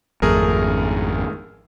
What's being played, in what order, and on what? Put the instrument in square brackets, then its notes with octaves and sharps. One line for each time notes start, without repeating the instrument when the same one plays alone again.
[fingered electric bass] G#1 F2 [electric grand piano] A3 G#4 A#4